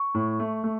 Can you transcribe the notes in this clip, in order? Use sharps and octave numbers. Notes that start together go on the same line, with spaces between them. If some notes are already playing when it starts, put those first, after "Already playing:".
Already playing: C#6
A2
A3
A3